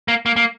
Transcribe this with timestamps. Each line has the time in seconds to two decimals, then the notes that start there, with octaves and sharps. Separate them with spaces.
0.08 A#3
0.26 A#3
0.36 A#3